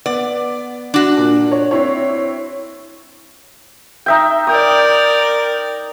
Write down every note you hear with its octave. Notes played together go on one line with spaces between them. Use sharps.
B3 D5
D4 F#4
A#2
C#5
C4 E4 C#5
D#4 E5 G5
A#4 D5 G5 D#6